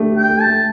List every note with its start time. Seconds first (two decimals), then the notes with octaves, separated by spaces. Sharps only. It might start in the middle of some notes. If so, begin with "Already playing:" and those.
Already playing: A3 D4 G4
0.11 G4
0.17 G5
0.30 A3
0.41 A5
0.47 A3